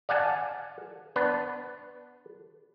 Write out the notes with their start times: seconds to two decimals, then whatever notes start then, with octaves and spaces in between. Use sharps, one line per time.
0.09 D5 F5 F#5 G#5 A5
1.16 B3 D4 B4